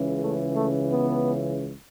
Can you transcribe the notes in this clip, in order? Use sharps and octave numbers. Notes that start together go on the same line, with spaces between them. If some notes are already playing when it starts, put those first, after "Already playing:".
Already playing: C#2 C#3 E3
A3
A3
B3